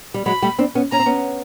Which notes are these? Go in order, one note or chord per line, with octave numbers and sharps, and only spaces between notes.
G3
F#3 G#3 B5
G3 A3
C4 D4
B3 C#4
C#4 A#5
C4
B3 C#4